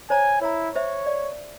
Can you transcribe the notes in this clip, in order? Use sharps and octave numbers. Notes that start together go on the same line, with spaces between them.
C5 C#5 G#5 A#5
E4 C#5 A#5
C5 C#5 E5
D5